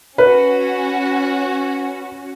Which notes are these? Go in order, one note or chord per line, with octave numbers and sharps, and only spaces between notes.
C#4 F#4 B4